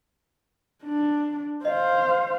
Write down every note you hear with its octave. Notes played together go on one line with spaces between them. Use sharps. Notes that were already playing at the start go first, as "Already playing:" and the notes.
D4
C5 D#5 F5